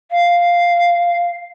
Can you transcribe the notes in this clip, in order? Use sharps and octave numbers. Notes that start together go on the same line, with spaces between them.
F5